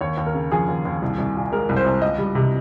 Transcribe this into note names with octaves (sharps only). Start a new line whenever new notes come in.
D#2 C#5
D#2
A#4
C#3
F3 G#4
D#2
D#2
C2
C2
A#2
G#3 A#4
C2
C5
C2
C#2 D#5
G3
C3